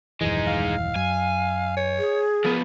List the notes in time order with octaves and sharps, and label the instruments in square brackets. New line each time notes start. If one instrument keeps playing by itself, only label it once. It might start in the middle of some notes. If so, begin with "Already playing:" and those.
[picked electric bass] D#1 F#2 E3 [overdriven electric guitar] G#3 D#4
[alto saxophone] F5
[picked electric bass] F#2 [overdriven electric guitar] G#5
[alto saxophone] C#5
[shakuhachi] G#4
[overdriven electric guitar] F3 B3 [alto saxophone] A#4